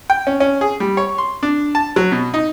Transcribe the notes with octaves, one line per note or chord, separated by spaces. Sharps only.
G5
C#4
C#4
G#4
G3
C#5
C6
D4
A5
F#3
B2
D#4